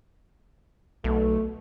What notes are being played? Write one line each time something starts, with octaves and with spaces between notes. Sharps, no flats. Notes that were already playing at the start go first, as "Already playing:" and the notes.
B1 A3